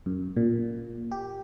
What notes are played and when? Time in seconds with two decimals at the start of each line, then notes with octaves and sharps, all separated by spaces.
0.06 F#2
0.37 A#2
1.11 G4